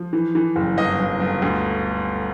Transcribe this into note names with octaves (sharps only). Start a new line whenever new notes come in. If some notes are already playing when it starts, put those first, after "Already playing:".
Already playing: F3
E3
E3
F#1
G1 D#5
G1
G1
D2